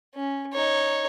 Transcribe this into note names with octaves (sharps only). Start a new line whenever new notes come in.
C#4
D#4 C#5